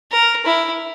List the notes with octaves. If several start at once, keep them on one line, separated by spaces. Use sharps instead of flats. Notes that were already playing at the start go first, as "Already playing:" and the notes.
A#4
E4